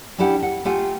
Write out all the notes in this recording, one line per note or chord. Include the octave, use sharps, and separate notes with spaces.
C#4 D4 E4 G4 F#5
F#5
A3 F4 G4 F5 F#5 G#5